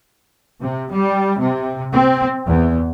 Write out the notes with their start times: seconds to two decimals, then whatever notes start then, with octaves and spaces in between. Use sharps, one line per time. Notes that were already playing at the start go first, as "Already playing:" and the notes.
0.59 C3
0.91 G3
1.38 C3
1.92 C4
2.46 E2